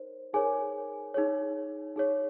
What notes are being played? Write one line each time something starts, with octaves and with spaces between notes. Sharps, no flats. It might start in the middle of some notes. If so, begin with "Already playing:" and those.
Already playing: D#4 A#4 C5 C#5
D#4 G#4 A#4 C#5 G#5
D#4 G#4 C#5
D#4 G#4 C#5